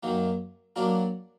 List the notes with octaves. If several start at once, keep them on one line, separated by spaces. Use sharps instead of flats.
F#2 D#3 F#3 A#3
F#3 A#3 D4 F#4 A#4